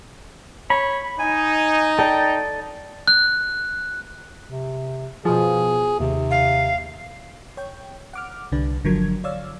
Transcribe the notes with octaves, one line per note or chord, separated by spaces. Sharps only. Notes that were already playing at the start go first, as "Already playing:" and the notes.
C#5 B5
D#4 G#5
A4 D5 G5
F#6
C3
B2 F3 G#4
D#2 C3
F5
C#5 G5
F#5 D6 F6
C2 D3 D4 B4
G1 D3 F3 F#3 A#4 G#6
C#5 D5 F5 E6